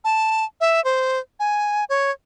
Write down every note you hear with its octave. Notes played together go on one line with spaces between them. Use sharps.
A5
E5
C5
G#5
C#5